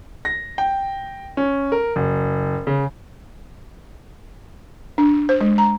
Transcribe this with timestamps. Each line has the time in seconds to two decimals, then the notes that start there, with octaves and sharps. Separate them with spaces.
0.25 A#6
0.58 G5
1.37 C#4
1.72 A#4
1.96 F#1
2.67 C#3
4.98 D4
5.29 C5
5.41 G#3
5.58 A#5